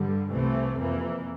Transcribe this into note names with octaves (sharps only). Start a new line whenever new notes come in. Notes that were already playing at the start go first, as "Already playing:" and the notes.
Already playing: G2 D3 G3
C2 C3 E3 A3 C4
F2 E3 A#3